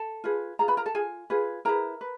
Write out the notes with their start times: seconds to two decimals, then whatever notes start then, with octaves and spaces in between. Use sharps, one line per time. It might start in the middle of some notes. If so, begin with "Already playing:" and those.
Already playing: A4 A5
0.24 F4 G#4 B4
0.59 F4 G#4 A#5
0.68 B4 B5
0.77 A#4 A#5
0.86 A4 A5
0.95 F4 G#4 G#5
1.30 F4 G#4 B4
1.65 E4 G#4 A#4 B4 A#5
2.01 B4